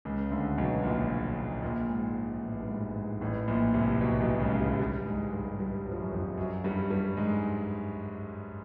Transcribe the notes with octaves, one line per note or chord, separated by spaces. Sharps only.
C#2 C#3
D2 D3
B1 B2
A#1 A#2
A#1 A#2
G#2
A1 A2
G2
G#2
G#2
A1 A2
A#1 A#2
C2 C3
B1 B2
B1 B2
C#2 C#3
F#3
G2 G3
F#3
G2 G3
G#2 G#3
G2 G3
G2 G3
F#3
F3
F#2 F#3
F2 F3
F#2 F#3
G2 G3
G2 G3
G#2 G#3